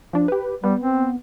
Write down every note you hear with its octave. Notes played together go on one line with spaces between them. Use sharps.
F3 D4
G4 B4
G3 B3
C4